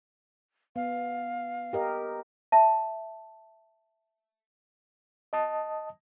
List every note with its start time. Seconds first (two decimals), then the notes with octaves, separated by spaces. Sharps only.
0.76 B3 F5
1.73 G4 A#4 D#5
2.52 E5 A5
5.33 D#5 A5 D#6